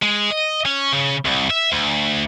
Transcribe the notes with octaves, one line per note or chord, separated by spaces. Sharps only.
G#3
D#5
C#4
C#3
C2
E5
D2